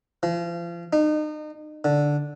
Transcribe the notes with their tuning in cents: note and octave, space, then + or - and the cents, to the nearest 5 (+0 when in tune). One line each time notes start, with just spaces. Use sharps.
F3 -35
D#4 -35
D3 -5